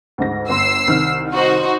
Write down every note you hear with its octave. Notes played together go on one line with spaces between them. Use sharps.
D2 G#2 A#6
G1 C6 E6 C7
C2 D#3 F6
D#4 F#4 C5